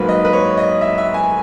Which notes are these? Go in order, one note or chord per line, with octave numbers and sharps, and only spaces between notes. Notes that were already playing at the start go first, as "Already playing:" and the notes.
Already playing: G#2 F#3 A#3 B4
D#5
B4
C#5
D#5
E5
E5
G#5